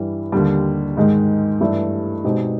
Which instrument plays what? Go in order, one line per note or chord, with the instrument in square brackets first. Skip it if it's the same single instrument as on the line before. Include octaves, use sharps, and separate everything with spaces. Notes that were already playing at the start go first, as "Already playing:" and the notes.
Already playing: [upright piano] G2 E3 G3
D#2 D3 G3
G#2 D#3 G#3
G2 E3 A3
B2 G#3 C4 D#4 G4